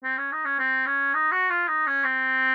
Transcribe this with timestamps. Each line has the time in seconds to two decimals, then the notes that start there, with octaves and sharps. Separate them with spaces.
0.04 C4
0.17 C#4
0.32 D#4
0.45 C#4
0.59 C4
0.86 C#4
1.14 D#4
1.32 F#4
1.50 F4
1.68 D#4
1.87 C#4
2.04 C4